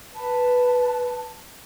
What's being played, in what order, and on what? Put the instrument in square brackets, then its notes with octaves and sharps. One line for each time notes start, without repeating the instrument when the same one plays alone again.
[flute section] B4 A5